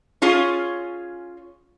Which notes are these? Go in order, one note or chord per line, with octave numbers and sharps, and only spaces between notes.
C#4 F4 G#4 C#5